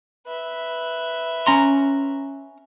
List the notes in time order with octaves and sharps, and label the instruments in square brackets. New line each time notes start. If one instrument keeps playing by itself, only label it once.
[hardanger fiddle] B4 E5
[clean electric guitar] C#4 A#5 C6